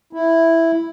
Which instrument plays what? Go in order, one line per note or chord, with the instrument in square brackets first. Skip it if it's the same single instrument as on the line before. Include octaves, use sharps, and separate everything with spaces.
[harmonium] E4